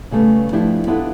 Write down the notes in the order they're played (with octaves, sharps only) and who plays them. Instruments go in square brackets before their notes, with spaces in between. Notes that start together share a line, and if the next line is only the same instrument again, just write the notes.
[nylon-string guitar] C#3 G3 A3 B3
F3 A3 D4 E4 G4
B3 D4 E4 F4 G4 A4